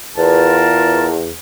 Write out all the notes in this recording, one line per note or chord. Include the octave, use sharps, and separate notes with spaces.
E2 F4 A#4 A5